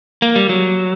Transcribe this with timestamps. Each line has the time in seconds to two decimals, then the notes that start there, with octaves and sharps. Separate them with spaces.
0.22 A#3
0.36 G3
0.49 F#3